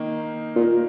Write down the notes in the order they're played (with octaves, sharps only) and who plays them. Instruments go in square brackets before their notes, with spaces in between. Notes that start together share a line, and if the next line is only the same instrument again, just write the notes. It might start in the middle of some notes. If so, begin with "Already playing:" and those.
Already playing: [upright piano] D#3 A#3 D#4
[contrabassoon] A#2